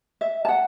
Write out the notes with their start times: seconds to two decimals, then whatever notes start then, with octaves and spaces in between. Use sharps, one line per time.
0.21 E5
0.45 A5
0.48 F#5